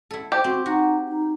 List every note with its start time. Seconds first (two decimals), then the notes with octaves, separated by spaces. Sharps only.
0.11 E4 A4
0.32 G4 C5
0.44 C4 F#4
0.66 D#4 F#4
1.08 D#4